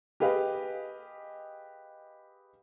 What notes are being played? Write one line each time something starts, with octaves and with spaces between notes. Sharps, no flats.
G4 G#4 B4 D#5 F5